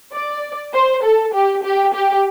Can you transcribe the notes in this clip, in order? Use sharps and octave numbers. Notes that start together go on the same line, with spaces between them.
D5
C5
A4
G4
G4
G4